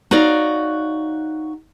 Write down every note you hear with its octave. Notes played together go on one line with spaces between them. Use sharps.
D#4 F#4 C#5 D5 F5